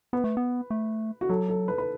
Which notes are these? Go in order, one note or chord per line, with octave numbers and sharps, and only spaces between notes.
B3 B4
A3
B3
A3
F#4
F#3 A4
A4
B4
B4